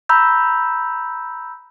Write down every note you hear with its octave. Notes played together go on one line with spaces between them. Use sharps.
A#5 B5 E6 G6